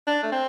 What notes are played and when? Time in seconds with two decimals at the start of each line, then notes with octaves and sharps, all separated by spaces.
0.07 D4
0.23 A3
0.32 C4